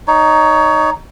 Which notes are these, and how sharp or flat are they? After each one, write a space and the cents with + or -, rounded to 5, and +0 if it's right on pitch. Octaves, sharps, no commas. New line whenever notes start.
D#4 +0 C#5 +25